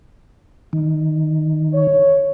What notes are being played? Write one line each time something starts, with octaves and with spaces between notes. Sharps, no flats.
D#3
C#5